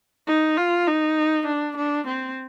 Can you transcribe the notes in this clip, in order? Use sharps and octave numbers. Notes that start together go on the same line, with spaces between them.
D#4
F4
D#4
D4
D4
C4